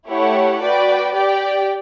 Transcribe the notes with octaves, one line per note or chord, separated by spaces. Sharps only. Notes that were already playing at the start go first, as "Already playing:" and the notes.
A3 E4 G4 C#5 F#5
F#4 B4 D5 G5
G4 D5 G5